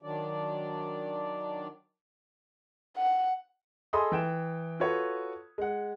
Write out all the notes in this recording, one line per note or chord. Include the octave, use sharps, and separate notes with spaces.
D#3 F#3 D4 D5
F#5
G#4 A4 D#5 B5 C6 D#6
E3 G5 E7
F4 F#4 A4 B4 C#5
G#3 F#5